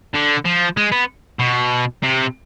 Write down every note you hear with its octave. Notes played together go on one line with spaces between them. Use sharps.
D3
F3
G#3
B3
B2
C3